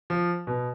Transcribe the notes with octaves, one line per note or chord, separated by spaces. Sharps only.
F3
B2